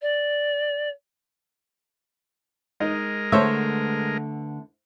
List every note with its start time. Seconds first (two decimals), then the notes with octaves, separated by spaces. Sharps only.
0.02 D5
2.80 G#3 D#4 A#4
3.32 D3 A3 B3 C5 C#5 E5